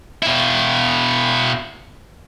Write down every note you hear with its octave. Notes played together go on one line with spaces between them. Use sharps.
B2 E4